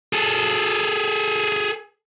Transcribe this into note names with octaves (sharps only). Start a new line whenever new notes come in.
G#4 A4